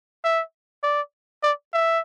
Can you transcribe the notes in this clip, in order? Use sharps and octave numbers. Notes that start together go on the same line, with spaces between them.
E5
D5
D5
E5